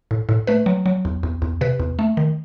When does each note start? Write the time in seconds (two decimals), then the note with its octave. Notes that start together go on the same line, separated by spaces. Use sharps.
0.11 A2
0.29 A2
0.47 A3 B4
0.66 F#3
0.86 F#3
1.05 E2
1.23 E2
1.42 E2
1.61 C3 B4
1.80 E2
1.99 A3
2.17 D#3